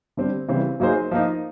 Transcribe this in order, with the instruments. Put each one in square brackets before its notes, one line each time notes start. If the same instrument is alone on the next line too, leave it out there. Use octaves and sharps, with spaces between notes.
[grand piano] D3 G3 C4
C#3 E3 G3 C4
F#3 A#3 D#4 G#4 C5
F3 A#3 D#4